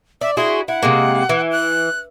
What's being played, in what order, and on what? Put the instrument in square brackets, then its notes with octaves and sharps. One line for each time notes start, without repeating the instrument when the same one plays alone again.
[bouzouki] D5 [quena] E5
[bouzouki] E4 F#4 G#4 [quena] C6
[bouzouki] E4 [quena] F#5
[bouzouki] C3 G#3 A#3
E3
[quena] F#6